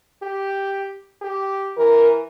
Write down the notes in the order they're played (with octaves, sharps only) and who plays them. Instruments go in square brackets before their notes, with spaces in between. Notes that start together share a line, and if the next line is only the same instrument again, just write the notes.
[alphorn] G4
G4
[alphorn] E3 [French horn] A#4